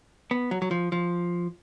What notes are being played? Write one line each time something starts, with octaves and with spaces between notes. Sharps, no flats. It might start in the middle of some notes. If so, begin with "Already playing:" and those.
B3
F#3
F#3
F3
F3